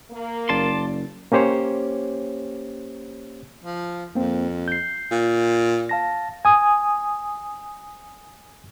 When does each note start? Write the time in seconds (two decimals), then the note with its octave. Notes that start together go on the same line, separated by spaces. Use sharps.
0.11 A#3
0.49 F#1 D5 A5 C6
1.32 A#3 C#4 G4 C5 C#5
3.64 F3
4.15 F2 A#3 C4
4.68 G6 C7
5.11 A#2
5.89 F5 A5 A#6
6.45 G#5 D#6